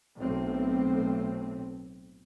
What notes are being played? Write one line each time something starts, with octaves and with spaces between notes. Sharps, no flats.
B1 A2 C4